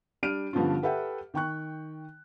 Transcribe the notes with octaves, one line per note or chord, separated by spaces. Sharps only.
G3 D4 F6 D7 D#7
G2 D3 F3 B3 C#4 F4
G4 A4 B4 E5 F#5 G5
D#3 G5 C#6 F#6